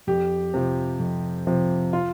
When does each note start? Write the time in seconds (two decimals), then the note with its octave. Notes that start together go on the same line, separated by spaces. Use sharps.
0.07 F2 G4
0.54 C3 F3
1.00 F2
1.47 C3 F3
1.93 F4